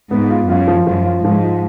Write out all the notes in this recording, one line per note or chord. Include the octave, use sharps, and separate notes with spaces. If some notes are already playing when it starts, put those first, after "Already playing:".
G#2 B3
F4
F#2 F4
F3
F#2 F3
F4
G#2 F3
F4